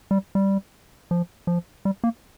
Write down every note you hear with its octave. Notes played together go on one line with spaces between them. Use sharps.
G3
G3
F3
F3
G3
A#3